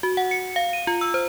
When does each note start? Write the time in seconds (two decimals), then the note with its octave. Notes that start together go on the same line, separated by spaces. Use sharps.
0.03 F#4
0.17 F#5
0.31 C#7
0.56 F5
0.73 D#7
0.87 F4
1.01 E6
1.14 C5